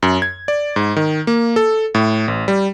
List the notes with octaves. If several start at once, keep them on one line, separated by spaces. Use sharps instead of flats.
F#2
G#6
D5
G#2
D#3
A#3
A4
A2
A1
G3